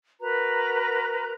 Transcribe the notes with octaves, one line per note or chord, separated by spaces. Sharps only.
F#4 A#4 B4 A#5